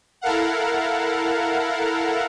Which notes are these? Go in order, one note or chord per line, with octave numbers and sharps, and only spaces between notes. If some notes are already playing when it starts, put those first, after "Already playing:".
E4 A4 A#4 F5 F#5